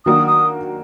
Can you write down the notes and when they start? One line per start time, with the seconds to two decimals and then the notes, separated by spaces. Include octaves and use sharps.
0.05 D#3 F#3 A#3 D4 F#4 D#6
0.27 D#6